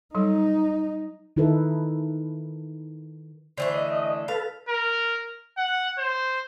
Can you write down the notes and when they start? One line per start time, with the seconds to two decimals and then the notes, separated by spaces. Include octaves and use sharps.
0.15 F#3 G3 D#4 A4
1.36 D#3 D#4 E4 A4 B4
3.57 D3 E3 A3 C5
3.75 D#5
4.28 A4 B4 F5
4.69 A#4
5.57 F#5
5.98 C5